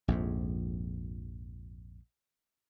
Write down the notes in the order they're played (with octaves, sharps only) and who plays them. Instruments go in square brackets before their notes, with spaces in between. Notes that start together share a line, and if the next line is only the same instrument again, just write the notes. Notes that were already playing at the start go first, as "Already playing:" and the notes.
[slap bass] A#1 F2 G#2